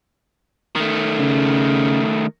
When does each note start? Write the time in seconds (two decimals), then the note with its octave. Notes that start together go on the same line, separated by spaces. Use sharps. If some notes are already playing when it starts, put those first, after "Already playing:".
0.76 D#3 A3
1.20 C#3